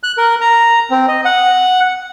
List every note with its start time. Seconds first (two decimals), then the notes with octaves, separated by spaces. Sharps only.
0.03 F#6
0.18 A#4
0.41 A#5
0.91 C4
1.08 D#5
1.25 F#5